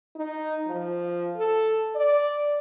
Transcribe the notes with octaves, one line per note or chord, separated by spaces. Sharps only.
D#4
F3
A4
D5